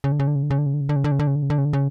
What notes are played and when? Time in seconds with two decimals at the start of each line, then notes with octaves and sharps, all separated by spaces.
0.04 C#3
0.12 D3
0.19 C#3
0.27 D3
0.35 C#3
0.43 D3
0.51 C#3
0.58 D3
0.66 C#3
0.74 D3
0.81 C#3
0.89 D3
0.96 C#3
1.04 D3
1.12 C#3
1.19 D3
1.27 C#3
1.36 D3
1.43 C#3
1.50 D3
1.58 C#3
1.65 D3
1.73 C#3